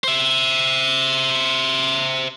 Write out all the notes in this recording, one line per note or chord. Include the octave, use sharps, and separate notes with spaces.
C5 E5